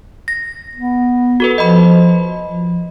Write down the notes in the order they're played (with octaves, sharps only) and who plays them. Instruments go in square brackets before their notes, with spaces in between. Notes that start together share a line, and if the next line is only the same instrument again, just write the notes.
[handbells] A#6
[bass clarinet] B3
[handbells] F#4 A4 B4
[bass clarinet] F3 [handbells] D#5 B5
[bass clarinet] F3